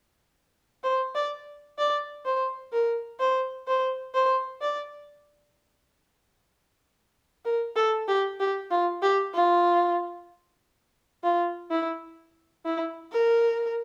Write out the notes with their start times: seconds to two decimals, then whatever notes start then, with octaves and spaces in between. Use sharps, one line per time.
0.84 C5
1.15 D5
1.78 D5
2.25 C5
2.72 A#4
3.20 C5
3.68 C5
4.14 C5
4.61 D5
7.45 A#4
7.76 A4
8.08 G4
8.40 G4
8.71 F4
9.02 G4
9.34 F4
11.23 F4
11.71 E4
12.65 E4
13.12 A#4